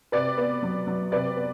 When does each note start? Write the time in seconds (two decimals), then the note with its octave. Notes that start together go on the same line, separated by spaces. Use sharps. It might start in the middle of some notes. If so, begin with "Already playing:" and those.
0.12 C3 B4 D5
0.38 B3
0.63 F#3
0.87 F#3
1.12 C3 B4 D5
1.37 B3